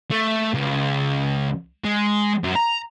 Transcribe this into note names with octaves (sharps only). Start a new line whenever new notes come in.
A3
C#2
G#3
F#2
A#5